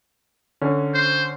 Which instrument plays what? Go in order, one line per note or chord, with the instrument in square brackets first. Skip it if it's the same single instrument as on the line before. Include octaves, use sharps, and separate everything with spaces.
[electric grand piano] D3 C#4
[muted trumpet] C5